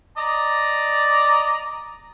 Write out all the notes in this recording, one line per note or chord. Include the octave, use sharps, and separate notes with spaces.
D5 D#5 A#5